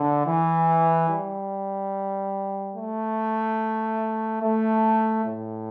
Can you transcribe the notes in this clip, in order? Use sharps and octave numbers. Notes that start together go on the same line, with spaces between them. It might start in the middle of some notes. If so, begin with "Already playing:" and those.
Already playing: D3
E3
G3
A3
A3
A2